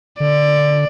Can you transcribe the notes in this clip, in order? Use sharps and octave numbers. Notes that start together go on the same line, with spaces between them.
D3 D5